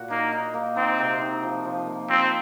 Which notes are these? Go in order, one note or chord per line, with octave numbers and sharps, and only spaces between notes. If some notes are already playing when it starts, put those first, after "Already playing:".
Already playing: A#2 F#4
A#3 D#4
D#4
A#3
C4 D#4
C3
D#4
F3
F3
A#3
F3 C4